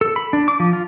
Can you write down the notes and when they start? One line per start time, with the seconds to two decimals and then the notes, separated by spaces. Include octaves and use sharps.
0.01 A4
0.16 B5
0.33 D4
0.48 D6
0.60 F3
0.73 F4